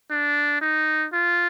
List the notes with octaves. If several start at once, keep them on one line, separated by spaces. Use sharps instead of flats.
D4
D#4
F4